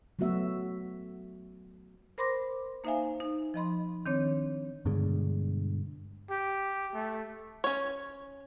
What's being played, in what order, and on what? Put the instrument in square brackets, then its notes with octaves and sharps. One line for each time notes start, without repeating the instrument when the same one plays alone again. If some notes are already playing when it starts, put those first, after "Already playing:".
[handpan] F#3 A3 B3 F#4 E5
[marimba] A#4 C5 B5 C6 D6 A#6
A#3 D#4 C5 E5 F5 G#5
D#4
F3 D#5 B5 C6
D#3 C4 D4 C#5
[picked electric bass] G2 B2 D3 G#3
[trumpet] G4
A3
[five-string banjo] C#4 C#5